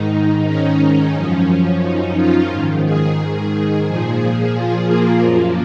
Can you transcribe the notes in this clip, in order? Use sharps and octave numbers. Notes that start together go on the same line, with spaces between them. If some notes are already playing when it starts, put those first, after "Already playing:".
Already playing: G#2 D#3 D#4
C#4
C#4
F#2 F3
D#4
F4
G#2 D#3
G#4
G#4
A#2 F3
F4
A#3
F#2 F3 A#3